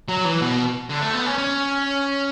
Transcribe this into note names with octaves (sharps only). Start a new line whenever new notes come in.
F#3
E3
B2
D3
A3
B3
C#4
C#4